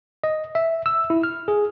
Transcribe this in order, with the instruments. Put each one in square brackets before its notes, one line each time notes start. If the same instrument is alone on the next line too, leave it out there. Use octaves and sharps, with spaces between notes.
[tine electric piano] D#5
E5
E6
E4
F6
G#4